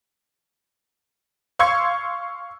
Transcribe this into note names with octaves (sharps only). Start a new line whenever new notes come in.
F5 C6 C#6 E6 G#6 C#7